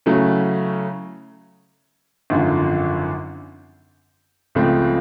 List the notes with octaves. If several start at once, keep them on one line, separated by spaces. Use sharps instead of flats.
C#3 F#3 A3 C#4 E4
G#1 F#2 D3 F3
C#2 C#3 F3 A3 C4